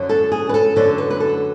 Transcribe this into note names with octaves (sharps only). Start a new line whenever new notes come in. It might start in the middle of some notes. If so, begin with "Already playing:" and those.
Already playing: F#2 D3 F#3
A4
G#4
B4
A4
F#2 D3 F#3 A4
B4
B4
A4